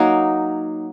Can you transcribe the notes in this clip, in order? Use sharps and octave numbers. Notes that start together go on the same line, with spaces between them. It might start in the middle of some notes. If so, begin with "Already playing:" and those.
Already playing: F#3 A#3 D#4